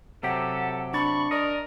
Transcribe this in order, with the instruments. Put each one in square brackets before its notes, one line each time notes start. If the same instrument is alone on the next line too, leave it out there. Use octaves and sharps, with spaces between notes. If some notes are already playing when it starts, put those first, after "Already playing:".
[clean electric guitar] C3 F#3 G4 [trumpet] A4 [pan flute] F#5
[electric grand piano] D4 A6 [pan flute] B5 [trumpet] C#6
[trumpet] A#4 [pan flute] D5 [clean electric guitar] D#5